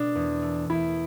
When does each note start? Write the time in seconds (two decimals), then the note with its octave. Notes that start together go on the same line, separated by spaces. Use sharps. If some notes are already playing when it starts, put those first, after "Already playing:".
Already playing: B2 A3 D4
0.15 E2
0.42 A3
0.70 E2 E4